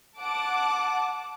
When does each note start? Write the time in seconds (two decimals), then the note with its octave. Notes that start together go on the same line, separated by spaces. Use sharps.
0.19 F#5 A5 D6